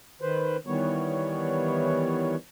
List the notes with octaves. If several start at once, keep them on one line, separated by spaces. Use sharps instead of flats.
D#3 B4 C5
D#3 E3 G3 B3 C#5